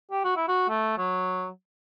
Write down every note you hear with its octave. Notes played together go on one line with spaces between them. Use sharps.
G4
F#4
E4
F#4
A3
F#3